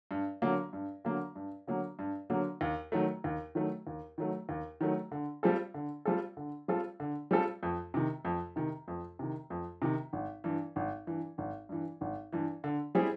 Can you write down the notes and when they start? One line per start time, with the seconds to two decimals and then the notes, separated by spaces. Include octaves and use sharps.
0.11 G2
0.42 D3 F#3 A#3
0.73 G2
1.05 D3 F#3 A#3
1.36 G2
1.67 D3 F#3 A#3
1.99 G2
2.30 D3 F#3 A#3
2.61 D#2
2.92 D#3 F#3 A3
3.24 D#2
3.55 D#3 F#3 A3
3.87 D#2
4.18 D#3 F#3 A3
4.49 D#2
4.81 D#3 F#3 A3
5.12 D3
5.43 G3 C4 F4 A4
5.74 D3
6.05 G3 C4 F4 A4
6.37 D3
6.68 G3 C4 F4 A4
7.00 D3
7.31 G3 C4 F4 A4
7.63 F2
7.94 C3 D#3
8.25 F2
8.56 C3 D#3
8.88 F2
9.19 C3 D#3
9.50 F2
9.82 C3 D#3
10.13 G#1
10.44 G2 E3
10.76 G#1
11.07 G2 E3
11.38 G#1
11.69 G2 E3
12.01 G#1
12.32 G2 E3
12.64 D3
12.95 G3 C4 E4 G#4